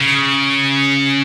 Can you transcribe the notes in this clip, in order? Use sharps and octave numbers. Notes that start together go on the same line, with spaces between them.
C#3